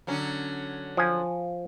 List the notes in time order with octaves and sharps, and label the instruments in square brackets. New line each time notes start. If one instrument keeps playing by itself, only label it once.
[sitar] D3 F#3 C#4
[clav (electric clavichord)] F3 G#5